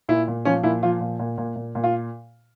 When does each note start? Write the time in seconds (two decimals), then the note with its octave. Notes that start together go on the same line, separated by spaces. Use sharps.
0.09 A#2 E4
0.28 A#2
0.45 F3 C#4
0.63 A#2 E4
0.83 F3 F4
1.00 A#2
1.19 A#2
1.38 A#2
1.56 A#2
1.75 A#2
1.84 F4